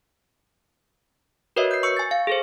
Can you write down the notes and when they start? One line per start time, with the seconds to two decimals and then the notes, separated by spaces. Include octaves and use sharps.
1.56 F#4 A#4 B4 C#5 D#5 E5
1.71 G6 C7
1.83 C#6 E6 G6 C#7
1.97 G#5 A6
2.11 F5
2.27 G#4 A4 C5